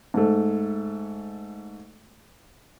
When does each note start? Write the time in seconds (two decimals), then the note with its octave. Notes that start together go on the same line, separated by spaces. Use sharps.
0.14 G#2 A3